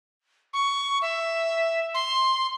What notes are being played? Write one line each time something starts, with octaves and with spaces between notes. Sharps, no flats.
C#6
E5
C6